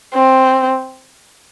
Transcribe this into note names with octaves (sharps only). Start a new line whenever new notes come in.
C4